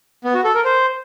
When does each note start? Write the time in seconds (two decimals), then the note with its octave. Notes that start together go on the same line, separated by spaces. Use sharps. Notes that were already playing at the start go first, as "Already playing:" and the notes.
0.24 B3
0.34 F#4
0.44 A4
0.54 A#4
0.65 C5